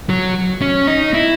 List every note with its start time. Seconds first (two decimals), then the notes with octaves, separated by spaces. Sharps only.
0.09 F#3
0.61 C#4
0.87 D#4
1.14 E4